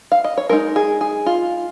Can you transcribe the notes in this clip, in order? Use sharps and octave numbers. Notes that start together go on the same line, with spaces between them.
F5
D#5
C#5
G#3 D#4 A#4
G#4
G#4
F4